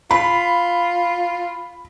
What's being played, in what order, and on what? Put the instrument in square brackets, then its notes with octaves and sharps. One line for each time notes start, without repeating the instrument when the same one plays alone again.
[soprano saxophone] F4 [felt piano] B5